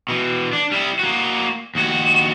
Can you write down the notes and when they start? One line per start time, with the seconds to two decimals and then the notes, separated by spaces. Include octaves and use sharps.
0.08 B2 E3
0.53 D4
0.72 G3 E4
0.99 A#3 F#4
1.75 D#2 F#4